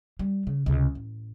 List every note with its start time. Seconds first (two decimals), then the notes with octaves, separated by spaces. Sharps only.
0.19 G3
0.47 C#3
0.66 C#2 C3
0.95 A1